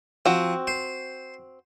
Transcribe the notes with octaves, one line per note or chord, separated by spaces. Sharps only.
F3 C4 F#4
C5